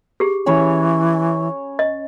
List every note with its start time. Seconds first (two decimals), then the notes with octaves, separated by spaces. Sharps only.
0.20 G4 G#4
0.46 E3 C#4 C#5 B5
1.79 D#5